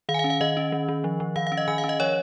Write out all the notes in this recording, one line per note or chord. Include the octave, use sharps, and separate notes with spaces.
D#3 F5
G#5
F5
C#4
F5
D#3 D#5
C#4
D#3
D#3
F3
F3
D#3 F5
F5
C#4
D#5
D#3 G#5
F5
C#4
D#5
F3 C#5